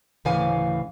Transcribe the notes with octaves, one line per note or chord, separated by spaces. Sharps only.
D2 A2 C#3 E3 F5 G#5